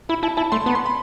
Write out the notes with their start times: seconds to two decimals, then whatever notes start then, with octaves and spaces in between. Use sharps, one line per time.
0.09 E4 B5
0.23 E4 A5
0.37 E4 A5
0.52 A3 C6
0.66 B3 B5
0.75 C6
0.86 B5